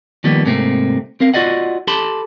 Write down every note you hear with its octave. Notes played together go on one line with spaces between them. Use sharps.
D#3 F3 G3 A#3 B3
G#2 C3 A3 A#3 C4
C4 A#4 F5
F4 F#4 D5 D#5 F#5
G4 A4 A5 B5 C6